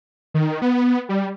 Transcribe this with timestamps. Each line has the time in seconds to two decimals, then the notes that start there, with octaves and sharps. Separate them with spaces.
0.34 D#3
0.62 B3
1.09 G3